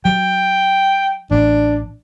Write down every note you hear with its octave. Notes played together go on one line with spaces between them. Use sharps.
F#3 G5
A1 D4